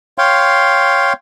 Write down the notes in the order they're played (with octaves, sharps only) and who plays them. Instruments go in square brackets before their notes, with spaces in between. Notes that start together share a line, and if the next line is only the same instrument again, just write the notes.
[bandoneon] C#5 F5 G5 C6